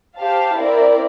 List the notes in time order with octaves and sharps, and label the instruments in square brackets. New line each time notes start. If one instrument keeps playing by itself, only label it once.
[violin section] G4 C5 F5 A5
C4 E4 A#4 D5